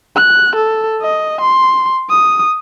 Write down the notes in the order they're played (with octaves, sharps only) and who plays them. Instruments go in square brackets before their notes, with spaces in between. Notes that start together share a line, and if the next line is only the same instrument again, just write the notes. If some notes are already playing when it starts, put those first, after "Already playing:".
[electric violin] F#6
A4
D#5
C6
D#6